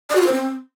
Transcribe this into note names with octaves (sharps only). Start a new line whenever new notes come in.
D5
F#4
F4
C5
C4